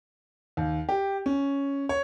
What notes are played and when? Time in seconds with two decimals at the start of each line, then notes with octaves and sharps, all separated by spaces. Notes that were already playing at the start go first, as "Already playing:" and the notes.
0.57 D#2
0.89 G4
1.26 C#4
1.89 C#5